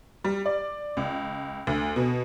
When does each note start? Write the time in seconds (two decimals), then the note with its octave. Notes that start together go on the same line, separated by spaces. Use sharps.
0.24 G3
0.46 D5
0.97 C#2
1.67 D2
1.96 B2